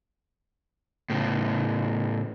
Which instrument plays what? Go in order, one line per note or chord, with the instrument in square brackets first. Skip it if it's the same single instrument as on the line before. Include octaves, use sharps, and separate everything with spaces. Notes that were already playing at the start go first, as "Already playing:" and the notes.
[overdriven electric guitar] A2 C#3